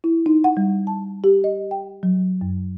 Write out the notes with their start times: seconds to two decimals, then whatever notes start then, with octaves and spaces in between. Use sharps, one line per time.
0.04 E4
0.26 D#4
0.44 F#5
0.57 G3
0.87 A5
1.24 G4
1.44 D#5
1.71 G5
2.03 F#3
2.41 F#2